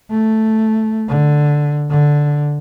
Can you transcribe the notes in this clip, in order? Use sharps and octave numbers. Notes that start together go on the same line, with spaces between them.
A3
D3
D3